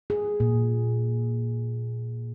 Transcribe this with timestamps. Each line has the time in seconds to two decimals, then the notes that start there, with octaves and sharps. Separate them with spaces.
0.10 G#4
0.40 A#2